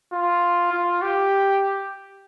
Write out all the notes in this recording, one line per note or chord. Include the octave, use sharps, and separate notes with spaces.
F4
F4
G4